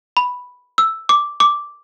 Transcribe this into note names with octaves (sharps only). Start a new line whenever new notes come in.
B5
E6
D6
D6